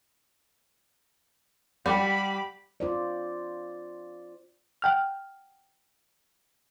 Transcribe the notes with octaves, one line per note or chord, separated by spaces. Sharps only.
G3 G4 D5 F#5 G5 B5
F4 C5 D5
F#5 G5 F6